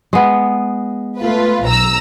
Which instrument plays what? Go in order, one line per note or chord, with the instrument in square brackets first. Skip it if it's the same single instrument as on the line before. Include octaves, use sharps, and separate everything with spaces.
[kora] G#3 B3
[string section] A3 F4 B4
B1 A#5 E6